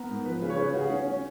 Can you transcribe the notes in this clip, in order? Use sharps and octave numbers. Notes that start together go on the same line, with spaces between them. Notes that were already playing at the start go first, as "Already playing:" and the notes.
Already playing: B3 A#4
G#2
F3 B4
C#3 B4
C#5
C#3 B4
C#3 F#4
G#4
C#4
C#4